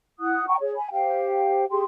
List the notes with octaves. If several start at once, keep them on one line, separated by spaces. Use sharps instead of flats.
E4 F#5 D#6 F#6
F#5 G5 A#5 C#6
G#4 C#5
G#5 B5
G4 C5 F5 G5
G4 G#4 G5 C6